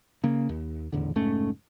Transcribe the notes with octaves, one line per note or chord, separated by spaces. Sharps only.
C#3 A#3
D#2
D#1 A1 E2 D3
F1 G#2 A3 C#4